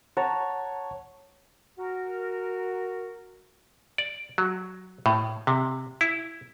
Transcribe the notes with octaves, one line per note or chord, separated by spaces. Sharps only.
C#5 F#5 A5 A#5
F#4 A#4
D5
F#3
A2
C3
E4